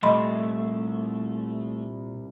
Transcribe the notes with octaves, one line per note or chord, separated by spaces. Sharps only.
C2 A#2 A3 D#5 B5 C6